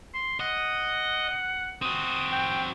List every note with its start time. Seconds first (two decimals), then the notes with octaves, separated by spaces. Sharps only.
0.14 C6
0.40 D#5 F#5
1.82 C4 F#4 D#6
2.32 G5